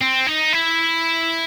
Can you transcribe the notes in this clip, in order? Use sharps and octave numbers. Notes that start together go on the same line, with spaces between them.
C4
D#4
E4